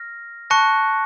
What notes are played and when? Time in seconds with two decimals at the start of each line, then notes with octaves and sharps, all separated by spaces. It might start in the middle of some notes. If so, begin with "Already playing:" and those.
Already playing: F6 A#6
0.50 A5 C#6 F#6 A#6 C#7